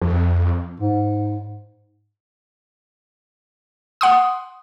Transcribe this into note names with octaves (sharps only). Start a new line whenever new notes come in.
F2
G#2
F#5 C6 D#6